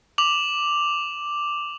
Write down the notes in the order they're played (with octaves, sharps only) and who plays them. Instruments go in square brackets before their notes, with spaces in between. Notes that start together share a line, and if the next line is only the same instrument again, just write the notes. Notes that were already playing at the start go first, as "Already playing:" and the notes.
[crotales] D6 F7 F#7